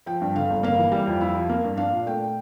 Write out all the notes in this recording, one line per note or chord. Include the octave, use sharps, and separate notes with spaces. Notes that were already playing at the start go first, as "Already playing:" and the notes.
F3 G5
G2
D3 F5
G1
A#3 F5
E3
G3
F2
E4
F3
A#3
G2
D4 F5
A#2
A3 G5